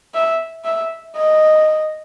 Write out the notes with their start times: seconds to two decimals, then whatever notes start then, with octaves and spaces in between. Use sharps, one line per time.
0.15 E5
0.65 E5
1.15 D#5